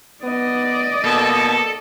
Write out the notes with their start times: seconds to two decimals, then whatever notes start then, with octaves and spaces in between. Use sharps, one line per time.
0.24 B3 D5 D#5
1.04 B2 A#3 A4